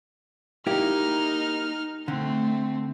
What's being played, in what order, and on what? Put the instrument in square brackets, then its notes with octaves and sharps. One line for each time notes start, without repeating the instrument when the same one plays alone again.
[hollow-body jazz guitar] A#3 E4 G4 [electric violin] D#4 F6
[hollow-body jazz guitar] D3 [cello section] A3 [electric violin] C4